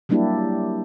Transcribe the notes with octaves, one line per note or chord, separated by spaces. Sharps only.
F#3 G3 A#3 D4 E4 G4